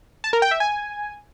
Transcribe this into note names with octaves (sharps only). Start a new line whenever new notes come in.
A5
A#4
G5
E5
G#5